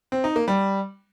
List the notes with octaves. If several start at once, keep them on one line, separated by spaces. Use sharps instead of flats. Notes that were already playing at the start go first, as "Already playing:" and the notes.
C4
D#4
A#3
G3